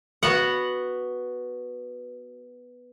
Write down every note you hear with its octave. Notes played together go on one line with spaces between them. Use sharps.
B3 F#4 B4 F#5